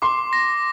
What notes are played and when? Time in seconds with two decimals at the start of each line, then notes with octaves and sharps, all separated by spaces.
0.02 C6 D6
0.33 A#6